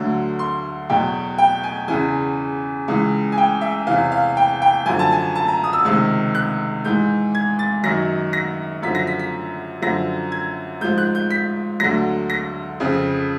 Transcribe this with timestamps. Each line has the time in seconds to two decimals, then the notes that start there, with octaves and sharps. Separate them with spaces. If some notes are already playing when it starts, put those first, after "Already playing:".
Already playing: D2 D3 F#3
0.39 C6
0.89 E2 B2 F#3 G5
1.38 G5
1.63 G#5
1.88 E2 C#3 E3 G#5
2.88 C#2 C#3 E3
3.32 G#5
3.38 G5
3.61 E5
3.87 E2 C3 E3 F5
4.12 F5
4.37 G5
4.62 G5
4.86 F#2 D3 F3 G#5
4.99 A5
5.12 G#5
5.35 A5
5.48 A#5
5.64 D#6
5.73 E6
5.85 C#2 C3 D#3 E6
6.35 F#6
6.85 G#2 E3 G6
7.35 G#6
7.59 A6
7.83 F#2 D#3 F#3 A#6
8.33 A#6
8.82 F#2 D3 F3 B6
8.95 A#6
9.07 B6
9.19 B6
9.82 F#2 D3 F3 A#6
10.32 G#6
10.81 G#2 F3 G6
10.98 F#6
11.15 G6
11.31 B6
11.80 D2 D3 F#3 A#6
12.30 A#6
12.80 F2 C#3 F3